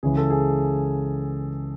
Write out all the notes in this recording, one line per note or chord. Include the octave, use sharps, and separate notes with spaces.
C#2 C#3 E3 G#4
A4
G#4